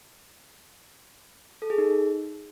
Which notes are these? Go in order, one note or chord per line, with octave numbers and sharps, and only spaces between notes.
A4
G#4
D#4